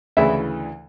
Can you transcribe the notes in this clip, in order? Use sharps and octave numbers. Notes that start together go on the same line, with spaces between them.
D2 C#3 E3 E4 E5